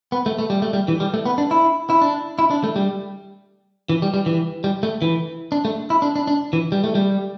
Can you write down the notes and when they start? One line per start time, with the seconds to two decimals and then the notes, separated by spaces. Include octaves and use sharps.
0.12 B3
0.26 A3
0.39 A3
0.50 G3
0.62 A3
0.73 G3
0.88 E3
1.00 G3
1.14 A3
1.26 B3
1.38 D4
1.51 E4
1.90 E4
2.02 D4
2.39 E4
2.51 D4
2.64 A3
2.76 G3
3.89 E3
4.02 G3
4.14 G3
4.26 E3
4.64 G3
4.83 A3
5.02 E3
5.52 D4
5.65 A3
5.90 E4
6.02 D4
6.16 D4
6.27 D4
6.53 E3
6.72 G3
6.84 A3
6.95 G3